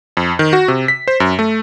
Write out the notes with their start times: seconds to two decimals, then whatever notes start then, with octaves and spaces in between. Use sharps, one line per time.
0.17 F2
0.39 D#3
0.53 F#4
0.68 C3
0.88 B6
1.08 C5
1.20 F#2
1.39 A3